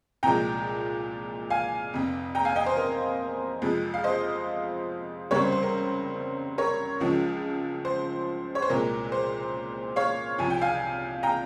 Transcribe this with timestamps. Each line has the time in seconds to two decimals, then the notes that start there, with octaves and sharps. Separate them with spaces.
0.23 C2 A#2 F3 G#3 G5 A#5
1.50 F5 G#5
1.93 F1 F2 C3
2.35 G5 A#5
2.45 F5 G#5
2.56 D#5 G5
2.66 C5
2.77 A#4
3.62 F2 C3 F3 G#3
3.94 F5
4.04 C5 D#5
5.31 C#2 C3 G3 A#4 C#5
5.42 C5
5.52 C5
5.62 A#4
6.58 A#4 C#5
7.00 C#2 C#3 F3 G#3
7.85 C5
8.55 C#5
8.62 C5
8.69 C2 A#2 G#3 A#4
9.12 C5
9.96 C#5 F5
10.38 C2 C3 F3 G#5
10.50 G5
10.62 F5 G#5
11.23 G5 A#5